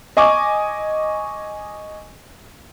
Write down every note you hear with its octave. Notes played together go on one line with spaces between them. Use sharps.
D#5 G#5 C#6 D6